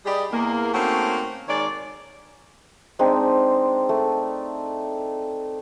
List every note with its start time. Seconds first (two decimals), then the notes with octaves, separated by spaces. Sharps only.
0.05 G3 G4 G#4 B4 D5 D#5
0.31 E2 A#3
0.74 A3 A#3 C4 C#4 D#4 F#4
1.48 D#3 G#3 C#5 D5
2.99 G#3 C4 D4 D#4
3.89 A3